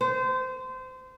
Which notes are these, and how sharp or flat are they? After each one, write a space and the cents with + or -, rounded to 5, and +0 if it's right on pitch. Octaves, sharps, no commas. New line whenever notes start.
C5 -25